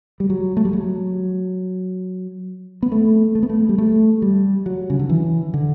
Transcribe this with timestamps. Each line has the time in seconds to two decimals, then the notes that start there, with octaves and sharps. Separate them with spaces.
0.20 G3
0.30 F#3
0.57 A3
0.65 G3
0.73 F#3
2.83 B3
2.92 A3
3.35 A3
3.43 B3
3.49 A3
3.69 G3
3.78 A3
4.22 G3
4.66 F#3
4.90 C#3
4.99 D3
5.09 E3
5.54 D3